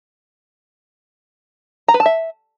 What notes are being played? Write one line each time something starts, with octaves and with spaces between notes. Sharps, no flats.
A#5
B4
A5
E5